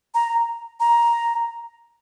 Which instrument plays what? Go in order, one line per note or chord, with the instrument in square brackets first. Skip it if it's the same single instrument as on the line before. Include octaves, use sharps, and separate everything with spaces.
[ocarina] A#5
A#5